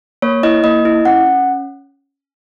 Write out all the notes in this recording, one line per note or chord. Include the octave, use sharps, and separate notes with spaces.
A#3 C#5
E4 D#5
A#3 D#5
E4
C#4 F#5
C#4